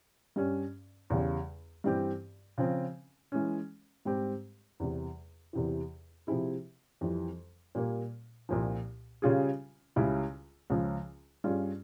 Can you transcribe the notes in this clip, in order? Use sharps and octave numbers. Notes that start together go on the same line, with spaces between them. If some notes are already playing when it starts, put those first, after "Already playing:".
G2 G3 C#4
E2 C#3 G3
G2 E3 G3 C4 G4
C#3 F3 C4
E3 G#3 C#4
G#2 G3 C4 G4
E2 C3 G3
E2 C3 E3
C3 F3 C4 E4 G#4
F2 E3 G3
A#2 G3 A#3
C2 A#2 F3
C#3 G3 C#4 F4 G#4
C#2 C#3 G3 C#4 E4
C#2 C#3 F3
G2 G3 C#4 F4 G#4